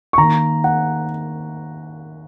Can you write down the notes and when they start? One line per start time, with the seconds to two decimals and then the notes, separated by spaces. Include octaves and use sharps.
0.13 C#6
0.18 D#3 A#3 A#5
0.64 F#5